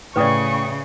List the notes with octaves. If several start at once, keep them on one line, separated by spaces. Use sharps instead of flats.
A2 C#3 B4 D5 G5 C#6 D#6